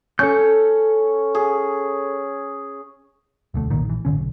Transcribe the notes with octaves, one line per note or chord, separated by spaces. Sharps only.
C#4 A4 G6
G#4
E1 D2 A3
B1 A#2 D#3
A#1 E3
G#1 G2 D3 C#4
B1